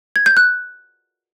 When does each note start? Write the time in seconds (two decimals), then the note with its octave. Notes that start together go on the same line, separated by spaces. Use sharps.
0.16 G#6
0.26 G6
0.37 F#6